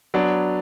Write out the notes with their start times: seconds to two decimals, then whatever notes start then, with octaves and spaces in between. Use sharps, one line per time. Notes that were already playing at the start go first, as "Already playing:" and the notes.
0.14 F#3 B3 D4